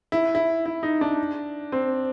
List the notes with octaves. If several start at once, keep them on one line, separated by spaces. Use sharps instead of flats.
E4
E4
E4
D#4
D4
C4